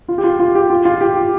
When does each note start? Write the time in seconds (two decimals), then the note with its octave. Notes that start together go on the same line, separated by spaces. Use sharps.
0.08 F4
0.18 G4
0.24 F4
0.39 F4
0.55 G4
0.70 F4
0.85 F4
1.01 G4